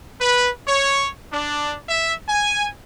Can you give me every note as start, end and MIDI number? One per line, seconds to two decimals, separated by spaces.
0.20 0.49 71
0.67 1.10 73
1.33 1.77 62
1.89 2.14 76
2.28 2.69 80